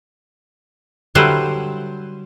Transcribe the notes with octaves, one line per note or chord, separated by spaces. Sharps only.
D3 F#3 G3 E4 B4 C5